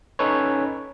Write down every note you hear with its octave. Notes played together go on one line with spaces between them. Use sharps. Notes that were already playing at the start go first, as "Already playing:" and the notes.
C#4 D#4 A4 B4 C#5